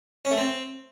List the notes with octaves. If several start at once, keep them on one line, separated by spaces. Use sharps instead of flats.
C#4
A3
C4